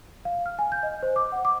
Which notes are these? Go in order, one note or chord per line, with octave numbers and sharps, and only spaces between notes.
F5
F6
G#5
G6
D#5
C5
D6
F#5
D6